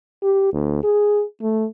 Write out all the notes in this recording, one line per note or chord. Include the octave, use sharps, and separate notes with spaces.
G4
D2
G#4
A3